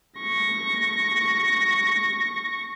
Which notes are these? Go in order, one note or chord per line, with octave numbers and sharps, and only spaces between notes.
C#6 A#6